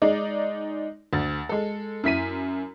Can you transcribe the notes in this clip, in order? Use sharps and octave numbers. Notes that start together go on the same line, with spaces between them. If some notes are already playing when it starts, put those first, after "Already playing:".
G#3 D#4 D5
D2 A6
G#3 A4
F#2 E4 B6 D#7